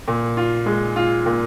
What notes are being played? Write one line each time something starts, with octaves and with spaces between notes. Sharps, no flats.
A#2
F4
G#3
F4
A#2